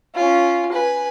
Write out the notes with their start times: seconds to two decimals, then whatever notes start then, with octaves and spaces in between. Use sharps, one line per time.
0.15 C#4 F4
0.72 B4 G#5